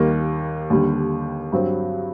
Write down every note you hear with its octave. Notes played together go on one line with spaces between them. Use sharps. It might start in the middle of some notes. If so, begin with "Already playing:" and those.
Already playing: D#2 D#3 G3 A#3
D#2 D3 G3
G2 F#3 C4